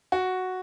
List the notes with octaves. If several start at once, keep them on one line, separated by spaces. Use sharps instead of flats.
F#4